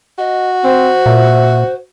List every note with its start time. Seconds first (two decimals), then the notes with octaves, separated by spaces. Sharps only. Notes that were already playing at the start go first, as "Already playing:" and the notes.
0.19 F#4 D#5
0.64 C4 C5
1.06 A#2 E5